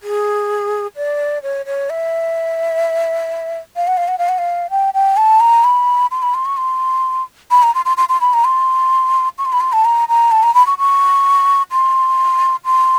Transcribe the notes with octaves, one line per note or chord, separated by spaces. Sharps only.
G#4
D5
C#5
C#5
E5
F5
F#5
F5
F#5
F5
F#5
F5
G5
G5
A5
A#5
B5
C6
B5
C6
C#6
C6
B5
A#5
C6
C6
C6
C6
B5
A#5
C6
C#6
C6
B5
C6
A5
A#5
A#5
A5
A#5
B5
C#6
C#6
C6
C6